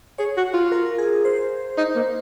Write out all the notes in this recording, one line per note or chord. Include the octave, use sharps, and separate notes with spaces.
G#4 C#5
F#4
F4
A#4
G#4
C5
D#4
A#3